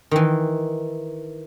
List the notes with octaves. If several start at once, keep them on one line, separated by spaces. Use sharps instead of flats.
D#3 E3